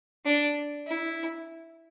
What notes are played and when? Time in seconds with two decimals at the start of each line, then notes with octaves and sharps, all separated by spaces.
0.25 D4
0.87 E4